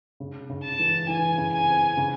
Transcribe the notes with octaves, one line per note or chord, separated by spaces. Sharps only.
C#3
C#3
A5
E3
E3 G#5
C#3
G#5
C4
C#3